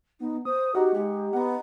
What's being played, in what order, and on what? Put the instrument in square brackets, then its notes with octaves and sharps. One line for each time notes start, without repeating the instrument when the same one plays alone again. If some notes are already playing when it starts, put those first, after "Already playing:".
[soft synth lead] B3 [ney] D#4
[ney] C5 [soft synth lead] D#6
[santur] D#4 F#5 [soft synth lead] F#4 [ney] G4
[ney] G#3 [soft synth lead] G4 [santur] G#5
[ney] B3 [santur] F#5 A#5